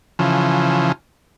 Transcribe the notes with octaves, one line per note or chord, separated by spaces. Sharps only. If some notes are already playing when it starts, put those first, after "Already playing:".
C#3 E3 F3